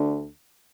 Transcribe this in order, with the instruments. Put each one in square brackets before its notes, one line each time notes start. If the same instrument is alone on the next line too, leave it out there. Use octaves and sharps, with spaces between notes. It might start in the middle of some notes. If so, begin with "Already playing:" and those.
Already playing: [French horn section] D2 D3